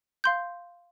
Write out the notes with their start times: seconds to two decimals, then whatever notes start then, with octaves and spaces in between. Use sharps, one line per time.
0.24 F5 C6 G6